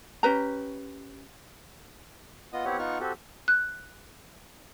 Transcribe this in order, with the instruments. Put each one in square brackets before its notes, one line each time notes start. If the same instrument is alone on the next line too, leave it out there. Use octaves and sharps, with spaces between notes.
[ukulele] C#4 G4 B4 A#5
[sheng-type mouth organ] B3 F4 D#5 D#6
B3 C4 E4 G4 C#5 F#5
B3 D#4 F4 F#5 C#6 F6
C4 F#4 G4 A4
[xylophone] F#6